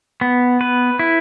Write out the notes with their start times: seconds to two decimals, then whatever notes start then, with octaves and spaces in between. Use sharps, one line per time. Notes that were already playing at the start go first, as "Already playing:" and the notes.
0.21 B3
0.61 B4
0.99 E4